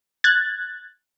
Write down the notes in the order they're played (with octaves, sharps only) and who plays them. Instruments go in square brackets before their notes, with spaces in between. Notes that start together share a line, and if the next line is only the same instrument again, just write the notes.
[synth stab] F#6 G#6 A6